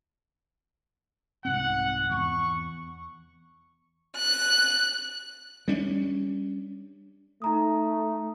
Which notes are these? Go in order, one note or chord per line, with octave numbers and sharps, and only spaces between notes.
C2 G#2 C4 F#5
E2 C#6
F#6
G3 C#4 D4
A3 D#4 A#5 D#6